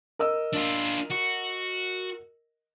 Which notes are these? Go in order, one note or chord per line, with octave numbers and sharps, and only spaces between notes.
A#4 D#5 E6
D4 F4
F#4